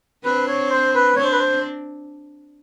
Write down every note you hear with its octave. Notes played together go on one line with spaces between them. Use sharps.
C4 D4 B4
C#5
C5
B4
C4 D4 C#5
C5
B4
C5